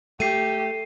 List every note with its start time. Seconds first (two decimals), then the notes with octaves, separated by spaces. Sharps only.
0.20 A3 G4 C7 D#7